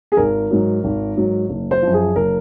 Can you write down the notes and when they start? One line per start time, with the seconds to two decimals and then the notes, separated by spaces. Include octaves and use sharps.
0.12 G#4
0.17 G#1 A#4
0.51 G#2 F#3
0.84 G#1
1.17 G#2 F#3
1.49 F#1
1.71 C5
1.82 F#2 F3
1.94 G#4
2.15 F#1 A#4